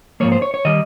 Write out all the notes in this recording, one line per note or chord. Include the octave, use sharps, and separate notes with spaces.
G#2 F3 A#3 C#5
C5
C#5
C#5
D#3 G3 D#5